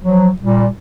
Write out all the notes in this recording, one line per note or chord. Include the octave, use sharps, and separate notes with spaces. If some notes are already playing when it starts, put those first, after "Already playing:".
F3 F#3
A#2 G3